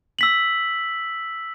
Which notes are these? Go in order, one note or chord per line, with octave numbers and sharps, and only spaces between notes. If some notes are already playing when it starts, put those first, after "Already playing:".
E6 B6 F#7